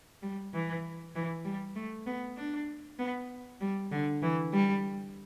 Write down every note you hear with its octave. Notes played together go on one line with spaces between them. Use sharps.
G3
E3
E3
G3
A3
B3
D4
B3
G3
D3
E3
G3